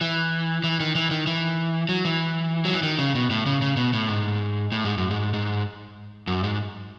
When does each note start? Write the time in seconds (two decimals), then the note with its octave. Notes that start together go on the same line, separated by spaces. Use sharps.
0.01 E3
0.64 E3
0.80 D#3
0.95 E3
1.11 D#3
1.26 E3
1.89 F#3
2.05 E3
2.65 F#3
2.73 E3
2.83 D#3
2.99 C#3
3.15 B2
3.30 A2
3.46 C#3
3.62 C#3
3.77 B2
3.93 A2
4.08 G#2
4.72 A2
4.85 G#2
4.98 F#2
5.11 G#2
5.33 G#2
6.27 F#2
6.44 G#2